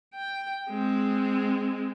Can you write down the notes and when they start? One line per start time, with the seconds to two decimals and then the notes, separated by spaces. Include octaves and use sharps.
0.14 G5
0.69 G#3 C4